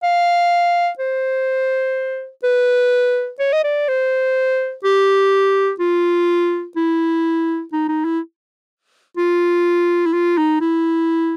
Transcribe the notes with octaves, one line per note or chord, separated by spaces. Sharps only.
F5
C5
B4
C#5
D#5
D5
C5
G4
F4
E4
D#4
D#4
E4
F4
E4
F4
D#4
E4